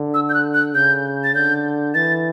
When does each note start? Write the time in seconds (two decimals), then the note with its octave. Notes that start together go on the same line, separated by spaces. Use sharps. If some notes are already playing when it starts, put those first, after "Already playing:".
Already playing: D3
0.14 E6
0.29 G6
0.34 F#6
0.54 F#6
0.75 C#3 G6
1.24 A6
1.35 D3 G6
1.94 E3 A6